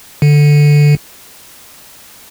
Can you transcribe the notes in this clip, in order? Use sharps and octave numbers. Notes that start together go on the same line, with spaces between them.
D3